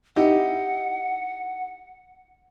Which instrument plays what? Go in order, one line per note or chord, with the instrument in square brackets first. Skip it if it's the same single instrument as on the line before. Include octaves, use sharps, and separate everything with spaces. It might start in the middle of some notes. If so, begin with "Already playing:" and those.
[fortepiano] D#4 E4 G4 [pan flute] F#5